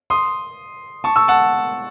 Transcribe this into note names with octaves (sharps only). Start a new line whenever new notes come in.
C6 D#6
A5 C#6
C#6 E6
F#5 A5